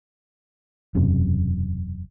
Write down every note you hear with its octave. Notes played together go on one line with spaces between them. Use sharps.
E1 F#2 C3